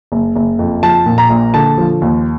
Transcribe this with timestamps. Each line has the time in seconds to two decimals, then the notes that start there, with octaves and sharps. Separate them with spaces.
0.12 F#1
0.36 F#1
0.59 F2
0.83 F3 A5
1.06 A#2
1.18 A#5
1.29 A#1
1.54 D3 A5
1.78 F3
2.02 D#2